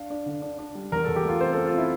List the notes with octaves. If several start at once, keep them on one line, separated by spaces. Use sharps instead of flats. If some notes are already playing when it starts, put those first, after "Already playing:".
Already playing: D4 F5
D4
D3
D4
D4
G3
E2 A#4
A4
E2
G4
A3 F4
C4 C5
C4 A4
F4
C4 E4